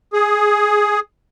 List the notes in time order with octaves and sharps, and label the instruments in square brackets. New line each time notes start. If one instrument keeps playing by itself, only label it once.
[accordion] G#4